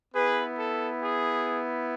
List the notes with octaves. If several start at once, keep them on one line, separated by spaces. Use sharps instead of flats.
B3 E4 G#4 B4
A4
G#4